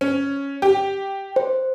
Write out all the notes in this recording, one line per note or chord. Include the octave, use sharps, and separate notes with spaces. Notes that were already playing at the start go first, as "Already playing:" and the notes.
C#4
G4
C5